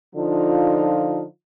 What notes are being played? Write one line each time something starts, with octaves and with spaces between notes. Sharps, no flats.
D3 F3 D#4 F4